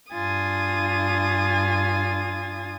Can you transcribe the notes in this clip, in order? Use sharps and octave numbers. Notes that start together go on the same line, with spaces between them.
G2 D4 F4 G#5 D#6 A6